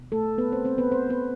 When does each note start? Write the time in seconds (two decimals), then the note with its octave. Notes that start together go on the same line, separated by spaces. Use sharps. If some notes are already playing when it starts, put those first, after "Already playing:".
Already playing: B2
0.12 A3 A4
0.38 B3 B4
0.52 C4 C5
0.65 C4 C5
0.78 B3 B4
0.92 C4 C5
1.09 B3 B4